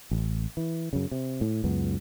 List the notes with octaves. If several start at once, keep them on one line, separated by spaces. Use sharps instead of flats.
A1
E3
F#2 C#3
C3
A2
C#2 F#2 B3